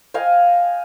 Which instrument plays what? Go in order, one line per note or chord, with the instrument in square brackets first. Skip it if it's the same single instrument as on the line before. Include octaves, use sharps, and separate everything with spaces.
[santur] D#5 F5 G5 G#5